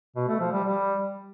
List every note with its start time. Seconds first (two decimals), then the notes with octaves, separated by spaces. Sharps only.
0.16 B2
0.28 A3
0.40 F3
0.52 G3
0.64 G3